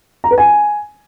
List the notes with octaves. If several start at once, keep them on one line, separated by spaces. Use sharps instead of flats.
A#5
B4
G#5